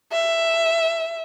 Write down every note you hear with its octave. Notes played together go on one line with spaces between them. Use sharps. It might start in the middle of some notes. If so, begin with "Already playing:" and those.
E5